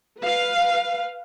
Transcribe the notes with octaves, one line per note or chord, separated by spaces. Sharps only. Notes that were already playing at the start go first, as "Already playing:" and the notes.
B4 F5